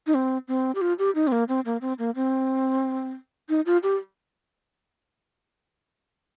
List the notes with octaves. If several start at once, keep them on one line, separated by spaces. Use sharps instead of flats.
D#4
C4
C4
G4
F4
G4
D#4
C4
A#3
C4
A#3
C4
A#3
C4
D#4
F4
G4